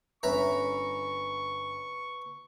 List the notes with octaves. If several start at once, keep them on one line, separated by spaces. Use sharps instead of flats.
G1 C#4 B4 E5 A#5 B5 C#6